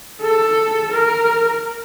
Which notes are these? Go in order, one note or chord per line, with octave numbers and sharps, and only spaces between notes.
A4
A#4